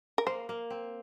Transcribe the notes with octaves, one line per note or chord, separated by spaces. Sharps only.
A#4
A#3 C5
A#3
C4